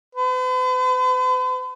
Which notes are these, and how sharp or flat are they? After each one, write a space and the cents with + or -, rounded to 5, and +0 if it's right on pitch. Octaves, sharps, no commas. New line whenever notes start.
B4 +45